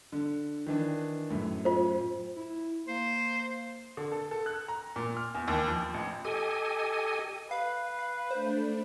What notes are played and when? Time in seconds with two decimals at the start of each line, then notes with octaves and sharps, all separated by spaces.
0.12 D3
0.66 D#3 E3 D4
1.30 F#2 A2
1.65 F4 C5
2.36 E4
2.88 A#3 C5
3.97 D3
4.12 A4
4.31 A4
4.46 F#6
4.68 A#5
4.96 A#2
5.17 F6
5.35 E2
5.48 D#2
5.68 F3
5.94 A1
6.25 G4 A4 D#5 G#5
7.51 B4 F5
7.99 F5
8.31 A3 D4 C5